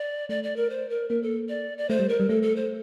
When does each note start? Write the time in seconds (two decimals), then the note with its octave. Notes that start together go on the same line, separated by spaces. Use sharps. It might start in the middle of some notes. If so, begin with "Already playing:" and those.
Already playing: D5
0.29 A3 D5
0.44 D5
0.56 A#4
0.70 C5
0.90 A#4
1.10 A#3 A#4
1.23 A4
1.49 D5
1.78 D5
1.89 A3 C5
1.99 G3
2.09 A#4
2.20 G3
2.29 A3 A4
2.42 A4
2.56 C5